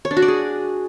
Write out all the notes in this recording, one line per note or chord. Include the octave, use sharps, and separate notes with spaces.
C#5
D4
F#4
D5
G#4